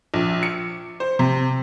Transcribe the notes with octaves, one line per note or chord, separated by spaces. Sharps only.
A#1
C#7
C5
C3